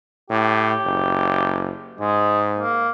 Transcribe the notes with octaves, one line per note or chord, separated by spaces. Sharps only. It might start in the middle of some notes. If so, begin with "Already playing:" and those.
A2 G4
F#1
G#2 G#3
A#3